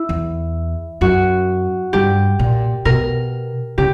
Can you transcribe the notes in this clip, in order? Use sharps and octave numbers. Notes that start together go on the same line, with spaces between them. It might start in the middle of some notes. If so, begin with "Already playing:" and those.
Already playing: E4
E2
F#2 F#4
G2 G4
A#2
B2 A#4
C#3 G4